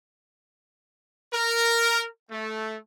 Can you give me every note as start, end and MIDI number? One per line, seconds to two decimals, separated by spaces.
1.33 2.06 70
2.31 2.78 57